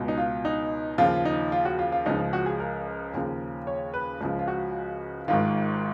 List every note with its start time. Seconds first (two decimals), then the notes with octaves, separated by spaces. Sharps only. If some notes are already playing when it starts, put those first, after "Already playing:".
Already playing: C#2 B2
0.08 D#4
0.18 F4
0.45 D#4
0.98 D#2 C#3 F3 F4
1.25 D#4
1.52 F4
1.65 F#4
1.79 F4
1.92 F4
2.06 C#2 C#3 F3 D#4
2.33 F#4
2.46 G#4
2.60 A#4
3.14 D#2 C#3 F3
3.67 C#5
3.94 B4
4.21 C#2 C#3 F3
4.39 F4
4.48 F#4
5.28 G#1 G#2 D#3 F4